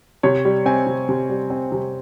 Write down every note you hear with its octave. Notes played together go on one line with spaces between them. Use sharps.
C3 C#5
G3
C4 G#5
C3
C3
G3
C4
C3